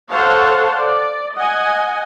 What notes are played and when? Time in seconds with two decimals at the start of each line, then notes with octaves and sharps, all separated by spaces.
0.11 A4 C5 C#5 F5 F#5 A5
0.77 D5
1.36 D#5 F#5 G#5